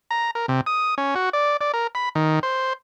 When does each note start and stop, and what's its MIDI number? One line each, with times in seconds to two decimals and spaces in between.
0.11 0.31 82
0.35 0.46 70
0.48 0.61 48
0.66 0.95 87
0.98 1.15 61
1.15 1.30 66
1.33 1.57 74
1.61 1.72 74
1.74 1.87 70
1.95 2.09 83
2.15 2.39 51
2.43 2.73 72